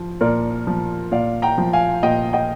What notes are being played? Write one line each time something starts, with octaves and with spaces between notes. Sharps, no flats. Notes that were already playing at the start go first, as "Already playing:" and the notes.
Already playing: F3
A#2 A#4 D5
F3
A#2 D5 F5
G5 A#5
F3
F5 G#5
A#2 D#5 G5
D#5 G5